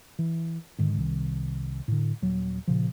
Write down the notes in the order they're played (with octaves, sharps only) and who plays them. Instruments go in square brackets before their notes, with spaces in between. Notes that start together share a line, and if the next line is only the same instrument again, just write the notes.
[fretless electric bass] E3
G#2 D3 D#3
C2 D#3
A2 D3
D#1 F#3
A#2 C#3 F3